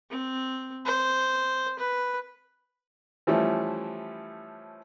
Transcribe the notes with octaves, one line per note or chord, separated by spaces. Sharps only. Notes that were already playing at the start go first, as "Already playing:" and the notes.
C4
C5
B4
E3 F3 G3 A3 C#4 E4